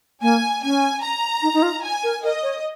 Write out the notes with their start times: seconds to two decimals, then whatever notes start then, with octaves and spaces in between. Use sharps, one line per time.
0.22 A#3 G#5
0.63 C#4 G#5
1.03 A#5
1.42 D#4
1.54 D#4
1.62 F4
1.83 G#5
2.04 A#4
2.23 A#4 D#5
2.43 C#5